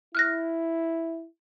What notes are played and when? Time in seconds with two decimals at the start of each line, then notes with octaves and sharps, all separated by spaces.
0.15 E4 F6 F#6 A#6